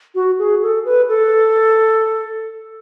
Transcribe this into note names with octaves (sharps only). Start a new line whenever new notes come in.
F#4
G#4
A4
B4
A4